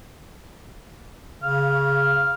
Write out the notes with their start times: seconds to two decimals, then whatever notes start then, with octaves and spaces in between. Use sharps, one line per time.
1.43 C#3 F5